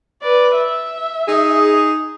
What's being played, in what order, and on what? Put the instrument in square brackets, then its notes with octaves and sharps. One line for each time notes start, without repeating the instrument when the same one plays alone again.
[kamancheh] B4 D5
E5
[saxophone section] D#4 G#4